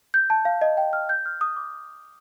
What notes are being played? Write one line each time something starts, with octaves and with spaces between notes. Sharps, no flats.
G6
A5
F5
D#5
G5
F6
G6
F6
D#6
D6